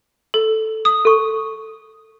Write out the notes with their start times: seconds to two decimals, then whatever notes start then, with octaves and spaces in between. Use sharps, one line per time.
0.34 A4
0.85 D#6
1.05 A4 C#6